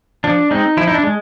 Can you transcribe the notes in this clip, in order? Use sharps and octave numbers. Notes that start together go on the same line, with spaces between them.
F3 D4
G#3 C4 D#4
F3 E4
D#4
D4
G#3